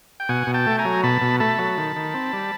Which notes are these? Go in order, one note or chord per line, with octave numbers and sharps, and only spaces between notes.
G5
B2 F#5 G#5
B2
G5 A5
A3
G#5 A#5
F#3
B2 A5 B5
B2
A3 A5 B5
F#3
D#3
D#3
C4
G3